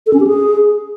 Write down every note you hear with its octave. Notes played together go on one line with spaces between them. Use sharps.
A4
C#4
G4
G#4